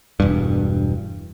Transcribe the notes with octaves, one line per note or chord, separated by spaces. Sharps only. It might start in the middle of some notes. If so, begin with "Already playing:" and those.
E1 G2